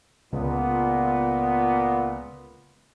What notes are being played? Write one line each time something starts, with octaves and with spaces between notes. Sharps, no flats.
C#2 A#2 B3